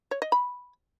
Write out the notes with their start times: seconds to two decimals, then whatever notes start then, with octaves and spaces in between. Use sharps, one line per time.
0.11 C#5
0.22 D#5
0.32 B5